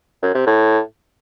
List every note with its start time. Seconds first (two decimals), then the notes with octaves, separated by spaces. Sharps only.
0.23 F#2
0.35 C3
0.47 A2